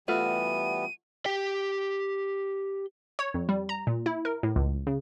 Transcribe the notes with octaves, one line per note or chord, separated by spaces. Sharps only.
E3 G3 A3 B3 F4 F#4 D#7
G4 G5
C#5
F2
G3
A#5
A#2
E4
A#4
A2
C#2
C#3